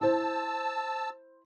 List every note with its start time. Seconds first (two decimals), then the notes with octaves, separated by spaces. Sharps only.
0.01 E4 C5 A5 E6